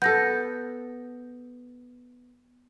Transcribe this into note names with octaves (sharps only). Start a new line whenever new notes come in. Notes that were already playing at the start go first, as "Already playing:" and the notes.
B3 A4 G6 A#6